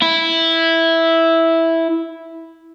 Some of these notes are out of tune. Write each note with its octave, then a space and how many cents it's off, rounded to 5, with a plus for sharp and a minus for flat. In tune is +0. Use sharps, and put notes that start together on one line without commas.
E4 -5